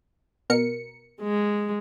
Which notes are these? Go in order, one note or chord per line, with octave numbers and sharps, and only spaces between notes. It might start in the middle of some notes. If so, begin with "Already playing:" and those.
B2 A#4 C#7
G#3